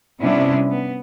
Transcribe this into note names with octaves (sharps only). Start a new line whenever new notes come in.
C3 G3 B3 C#4 D4 E4
B3